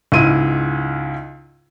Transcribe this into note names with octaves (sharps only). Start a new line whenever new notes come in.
C#2 G#2 E4 D#7